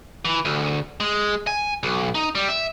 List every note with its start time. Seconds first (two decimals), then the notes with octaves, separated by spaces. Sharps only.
0.25 E3
0.45 D2
1.00 G#3
1.47 G#5
1.83 B1
2.15 D#4
2.35 G3
2.49 E5